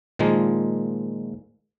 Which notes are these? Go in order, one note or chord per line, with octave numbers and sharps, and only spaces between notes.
A#2 D#3 F3 G#3 A#3